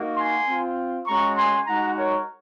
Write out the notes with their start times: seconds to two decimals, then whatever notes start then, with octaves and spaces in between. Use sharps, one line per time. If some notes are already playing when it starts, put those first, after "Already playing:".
Already playing: A#3 D#4 F#4
0.16 G#5 C6
0.46 C4 F4
1.06 G#3 C#4 F#4 A#5 C#6
1.37 G#5 C6
1.67 G#3 D#4 F#4 F#5 A#5
1.97 A#4 C#5